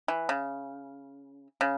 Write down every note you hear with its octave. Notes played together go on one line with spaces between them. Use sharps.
E3
C#3
C#3